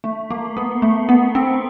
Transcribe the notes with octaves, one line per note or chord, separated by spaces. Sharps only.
A3
A#3
B3
A3
B3
C4